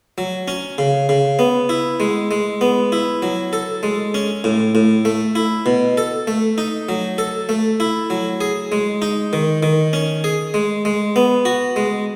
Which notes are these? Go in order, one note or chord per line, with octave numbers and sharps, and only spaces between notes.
F#3
C#4
C#3
C#3
B3
E4
G#3
G#3
B3
E4
F#3
A4
G#3
C#4
A2
A2
A3
E4
B2
A4
A3
D#4
F#3
A4
A3
E4
F#3
G#4
G#3
D#4
D#3
D#3
C#4
G#4
G#3
G#3
B3
F#4
G#3